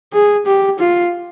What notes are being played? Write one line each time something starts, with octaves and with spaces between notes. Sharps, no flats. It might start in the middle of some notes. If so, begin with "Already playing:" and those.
G#4
G4
F4